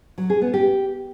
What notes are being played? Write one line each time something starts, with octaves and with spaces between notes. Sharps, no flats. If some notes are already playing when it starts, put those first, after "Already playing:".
F#3
G#4
B3
G4